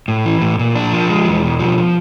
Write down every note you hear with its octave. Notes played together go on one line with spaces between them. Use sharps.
A2
E3
A2
A#2
D4
F3
G#3
E2
B2
F3